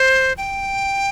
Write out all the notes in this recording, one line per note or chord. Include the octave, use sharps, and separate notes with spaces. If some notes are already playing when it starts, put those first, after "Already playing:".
Already playing: C5
G5